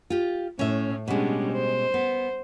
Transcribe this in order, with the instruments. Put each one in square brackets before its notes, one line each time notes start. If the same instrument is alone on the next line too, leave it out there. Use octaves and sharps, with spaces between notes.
[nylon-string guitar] F4 G4
[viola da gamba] A2 [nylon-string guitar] C#4 E5
[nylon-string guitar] B2 G#3 [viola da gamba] G3 C#4 D4
[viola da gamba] C5
[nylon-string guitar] B3